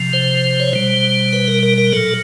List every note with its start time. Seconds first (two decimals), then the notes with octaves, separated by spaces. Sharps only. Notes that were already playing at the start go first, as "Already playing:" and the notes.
Already playing: C3 F3
0.13 C5
0.60 C#5
0.73 B2 G3 C5
1.33 B4
1.48 A#4
1.63 A#4
1.78 A#4
1.93 A#2 F#3 A4